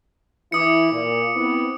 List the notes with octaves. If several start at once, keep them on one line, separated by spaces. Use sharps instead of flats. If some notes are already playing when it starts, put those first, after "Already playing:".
E3 E4 D6 D#6 C#7
A#2
B3 C4 E4